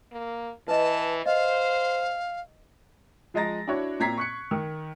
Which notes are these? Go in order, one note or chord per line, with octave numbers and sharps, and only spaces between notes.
A#3
E3 B4 D#5 A5
C5 D#5 F5
F3 G#3 D#5 A#5 A6 A#6
D4 E4 F#4 C#5
A#2 C4 A#5 G#6 B6 C7
C#6 F#6 C#7
D#3